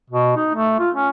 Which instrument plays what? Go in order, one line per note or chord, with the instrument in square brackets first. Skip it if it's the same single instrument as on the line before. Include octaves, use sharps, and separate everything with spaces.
[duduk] B2
D#4
A3
F4
C#4